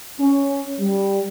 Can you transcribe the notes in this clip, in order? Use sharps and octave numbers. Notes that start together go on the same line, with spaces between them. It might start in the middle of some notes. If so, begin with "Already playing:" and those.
C#4
G3